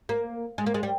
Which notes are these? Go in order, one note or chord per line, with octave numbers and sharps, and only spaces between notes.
A#3
G#3
A#3
G#3
G3